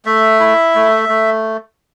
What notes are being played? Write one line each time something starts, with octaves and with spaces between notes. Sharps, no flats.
A3 E5
E4
A3
A3